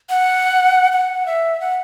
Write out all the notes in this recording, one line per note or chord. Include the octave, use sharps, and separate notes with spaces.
F#5
F#5
E5
F#5